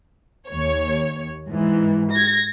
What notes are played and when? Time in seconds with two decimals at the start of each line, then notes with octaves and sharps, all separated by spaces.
0.50 D#2 C#5
1.47 G#2 E3
2.11 G#6 A#6